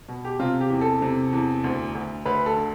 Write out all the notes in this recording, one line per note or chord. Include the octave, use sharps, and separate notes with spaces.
B2
G4
C3 F4
G4
E2
A4
C3
E2
D2
D2
D2 B4
A4
D3